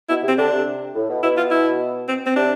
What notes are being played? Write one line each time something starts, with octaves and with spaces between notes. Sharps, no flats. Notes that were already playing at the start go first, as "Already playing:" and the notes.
B2 E4
C3
C4
D3 D4
C3
A2
B2
B2 E4
F4
E4
C4
C4
C3 D4